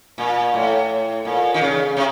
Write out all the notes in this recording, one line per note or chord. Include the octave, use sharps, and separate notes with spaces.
A#2
A2
A#2
D#3
C#3
C3